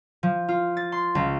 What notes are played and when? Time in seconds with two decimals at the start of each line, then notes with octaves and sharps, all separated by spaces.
0.23 F3
0.48 F4
0.77 A6
0.92 C6
1.15 C#2